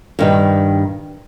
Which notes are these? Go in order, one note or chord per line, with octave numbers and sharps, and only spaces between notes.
G2 D#3 G3